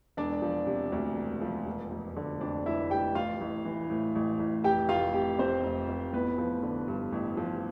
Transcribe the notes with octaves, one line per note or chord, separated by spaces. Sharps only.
E1 D4 D5
F3
C3
D2
E1
F3
F1
F1
D3
F2 D4 D5
F1 E4 E5
F1 G4 G5
A1 F4 F5
A1
E3
A2
A1
A1
F1 G4 G5
F1 F4 F5
C3 G4
F2 C4 C5
F1
F1
A1 B3 B4
F3
D3
G2
A1
F3